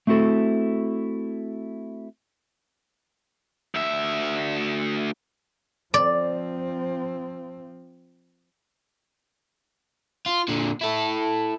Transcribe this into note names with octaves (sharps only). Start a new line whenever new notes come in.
A3 C4 E4 F#4 A4
D2 E5
F3 C4 D5
F4
A#2 D3
E4 A4